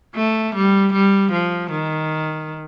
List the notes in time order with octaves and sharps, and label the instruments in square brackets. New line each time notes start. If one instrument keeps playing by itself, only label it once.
[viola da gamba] A3
G3
G3
F3
D#3